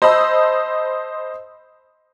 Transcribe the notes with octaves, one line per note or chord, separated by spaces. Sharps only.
C5 D#5 A5 B5 E6